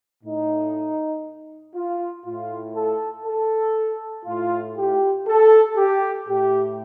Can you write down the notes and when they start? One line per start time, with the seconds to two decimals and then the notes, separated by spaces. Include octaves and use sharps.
0.24 A2 D#4
1.75 F4
2.26 A2 F4
2.75 A4
3.26 A4
4.26 A2 F4
4.77 G4
5.27 A4
5.77 G4
6.27 A2 G4